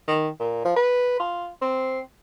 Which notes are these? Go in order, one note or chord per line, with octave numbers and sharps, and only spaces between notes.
D#3
A#2
F3
B4
F4
C4